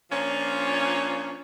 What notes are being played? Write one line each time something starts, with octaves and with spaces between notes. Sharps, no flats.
A#2 F3 C#4 D4 F4